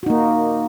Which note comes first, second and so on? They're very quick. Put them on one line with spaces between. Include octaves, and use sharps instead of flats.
F#4 D#4 A#3